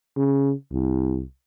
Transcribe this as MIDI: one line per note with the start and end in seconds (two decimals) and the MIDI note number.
0.17 0.53 49
0.72 1.23 36